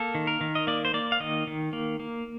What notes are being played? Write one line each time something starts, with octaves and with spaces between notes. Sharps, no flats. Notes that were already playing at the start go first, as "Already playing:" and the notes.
Already playing: A#3 A4
D#3
A#4
D#3
D#5
A#3 D5
C5
A#3 D5
F5
D#3 D#5
D#3
A#3
A#3